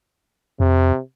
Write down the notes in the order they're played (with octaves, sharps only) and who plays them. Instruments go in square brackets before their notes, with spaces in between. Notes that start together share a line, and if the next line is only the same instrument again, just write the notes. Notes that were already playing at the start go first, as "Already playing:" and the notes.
[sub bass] F2 [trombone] C3